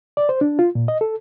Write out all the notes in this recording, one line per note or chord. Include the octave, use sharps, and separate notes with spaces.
D5
C5
D4
F4
A#2
D#5
A4